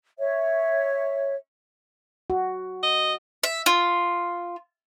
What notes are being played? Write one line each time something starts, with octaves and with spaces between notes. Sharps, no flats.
C#5 E5
F#4
D#5
E5
F4